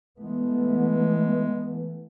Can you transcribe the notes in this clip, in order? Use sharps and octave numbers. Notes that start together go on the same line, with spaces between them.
E3 G#3 A3 B3